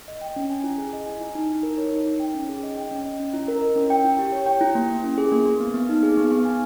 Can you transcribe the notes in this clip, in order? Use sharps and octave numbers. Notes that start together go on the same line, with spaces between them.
D#5
G5
C#4
G#5
E4
G#4
D#5
G#5
E4
D#4
D#4
A#4
C#5
D#4
D#4
G5
C#4
G#4
D#5
G5
C#4
D#5
C#4
E4
A#4
D#5
C#4
G5
E4
G4
C#5
G5
E4
A#3
A#3
C#4
G#4
A#3
A#3
B3
B3
D#4
G#4
B3
B3
G#5